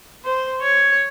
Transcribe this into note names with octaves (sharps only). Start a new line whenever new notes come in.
C5
C#5